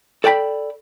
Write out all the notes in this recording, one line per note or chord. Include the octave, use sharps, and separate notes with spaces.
A4 D5 G5 A5 B5